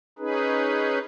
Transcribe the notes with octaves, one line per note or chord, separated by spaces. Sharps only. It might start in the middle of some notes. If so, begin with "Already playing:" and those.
C#4 D#4 G#4 B4